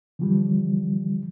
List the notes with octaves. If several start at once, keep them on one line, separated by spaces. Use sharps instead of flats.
D3 E3 F3 G3